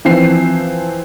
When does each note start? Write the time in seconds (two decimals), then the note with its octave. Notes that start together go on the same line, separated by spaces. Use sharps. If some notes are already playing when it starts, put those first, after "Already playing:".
0.05 E3 F3 C4 C7